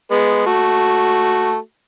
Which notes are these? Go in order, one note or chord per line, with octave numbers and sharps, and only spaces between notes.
G#3 B3
A3 F#4